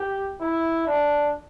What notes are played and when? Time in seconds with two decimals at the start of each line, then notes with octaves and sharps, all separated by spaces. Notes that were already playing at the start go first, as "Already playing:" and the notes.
Already playing: G4
0.41 E4
0.87 D4